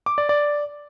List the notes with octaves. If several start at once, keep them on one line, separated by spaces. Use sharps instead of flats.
D6
D5
D5